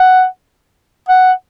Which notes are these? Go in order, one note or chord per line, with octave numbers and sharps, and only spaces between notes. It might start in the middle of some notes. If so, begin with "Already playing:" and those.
Already playing: F#5
F#5